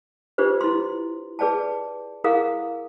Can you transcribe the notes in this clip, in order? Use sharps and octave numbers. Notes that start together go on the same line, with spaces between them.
D4 F4 G4 B4 C5
E4 C6
G#4 B4 D5 G5 A5
E4 G#4 A#4 F5 F#5 D#6